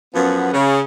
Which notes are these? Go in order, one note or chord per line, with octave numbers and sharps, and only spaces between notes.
F#2 F3 B3
C#3